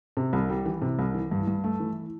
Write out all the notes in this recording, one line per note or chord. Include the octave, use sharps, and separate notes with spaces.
C3
C2
G3
E3
C3
C2
E3
G2
G2
A3
E3